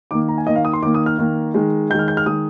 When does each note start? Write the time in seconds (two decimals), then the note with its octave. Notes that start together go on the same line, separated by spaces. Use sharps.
0.11 D#3 A#3 D6
0.28 A#5
0.38 G#5
0.47 D#3 A#3 D#5
0.56 F5
0.65 D#6
0.73 C6
0.83 D#3 A#3 D6
0.94 D#6
1.06 F6
1.18 D#3 A#3
1.54 D#3 G#3
1.90 D#3 G6
1.94 G#3
1.99 F6
2.08 G6
2.17 F6
2.26 D#3 G#3 D#6